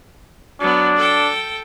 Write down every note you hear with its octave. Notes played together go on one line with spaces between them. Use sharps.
F#3 B3 D4
A4 G5